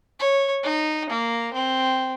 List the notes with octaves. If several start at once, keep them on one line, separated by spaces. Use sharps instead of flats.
C#5
D#4
A#3
C4